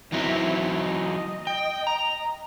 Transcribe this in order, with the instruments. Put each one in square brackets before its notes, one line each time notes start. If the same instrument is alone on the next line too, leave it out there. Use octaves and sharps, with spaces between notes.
[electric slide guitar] E3 F#3 D#4 [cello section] C4 E4
[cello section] D#5
[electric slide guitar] G5
A#5